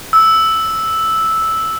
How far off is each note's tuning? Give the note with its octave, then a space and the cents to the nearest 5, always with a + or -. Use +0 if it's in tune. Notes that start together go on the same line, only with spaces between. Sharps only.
E6 -5